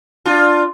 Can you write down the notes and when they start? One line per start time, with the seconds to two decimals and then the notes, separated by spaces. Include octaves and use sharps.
0.25 D4 F4